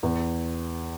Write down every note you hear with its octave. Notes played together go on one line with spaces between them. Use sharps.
E2